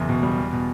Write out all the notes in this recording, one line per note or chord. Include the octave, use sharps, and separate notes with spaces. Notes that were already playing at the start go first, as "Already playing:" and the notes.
Already playing: F#1 E2
B2
G3
E2
B2